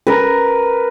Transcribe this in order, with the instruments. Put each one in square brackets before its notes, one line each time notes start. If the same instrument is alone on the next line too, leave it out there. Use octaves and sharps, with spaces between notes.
[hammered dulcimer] A#4 B4